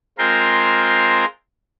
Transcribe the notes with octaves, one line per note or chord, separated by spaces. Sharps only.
G#3 C4 F4 A#4 C5